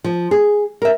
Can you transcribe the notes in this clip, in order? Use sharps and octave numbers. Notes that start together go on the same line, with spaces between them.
F3
G#4
A#4 E5